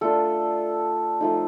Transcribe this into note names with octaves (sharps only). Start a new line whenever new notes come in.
A3 D4 F4 A4
F3 A3 D#4